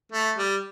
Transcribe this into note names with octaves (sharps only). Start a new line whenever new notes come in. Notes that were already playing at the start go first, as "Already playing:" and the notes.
A3
G3